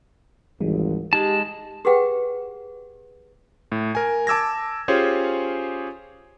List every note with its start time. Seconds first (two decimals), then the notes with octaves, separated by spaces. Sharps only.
0.61 G#1 C#2 E3 G3 G#3
1.13 G#3 D#4 G4 A5
1.85 G4 G#4 B4 F#5 G5
3.72 A2
3.95 A#4 G#5
4.27 A5 D6 E6 G#6 A#6
4.88 C#4 F4 G4 G#4 C5 C#5